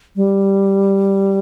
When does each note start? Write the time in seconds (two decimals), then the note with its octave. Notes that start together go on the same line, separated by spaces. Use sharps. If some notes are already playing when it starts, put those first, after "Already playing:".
0.16 G3